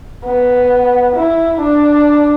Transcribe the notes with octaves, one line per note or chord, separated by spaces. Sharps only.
B3
E4
D4